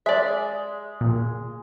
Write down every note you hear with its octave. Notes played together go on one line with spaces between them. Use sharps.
G#3 D5 E5
A#2